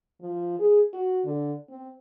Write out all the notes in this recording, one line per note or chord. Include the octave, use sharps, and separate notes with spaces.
F3
G#4
F#4
D3
C4